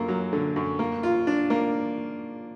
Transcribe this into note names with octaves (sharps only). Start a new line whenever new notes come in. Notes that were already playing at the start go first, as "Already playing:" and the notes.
Already playing: F#2 D3 A#3
F#3
D3
F#2
A#3
F4
D4
A#3